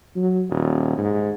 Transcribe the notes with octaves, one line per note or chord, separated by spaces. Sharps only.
F#3
D#1
G#2